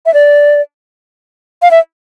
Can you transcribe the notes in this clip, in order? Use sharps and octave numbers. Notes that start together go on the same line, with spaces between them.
E5
D5
F5
E5